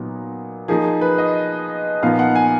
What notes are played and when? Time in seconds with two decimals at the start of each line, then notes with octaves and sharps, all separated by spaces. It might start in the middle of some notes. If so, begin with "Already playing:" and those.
Already playing: A#2 F#3 B3 D#4
0.68 F3 A#3 D#4 G#4
1.01 B4
1.18 D#5
2.02 A#2 F3 B3 D#4 F5
2.19 F#5
2.35 G#5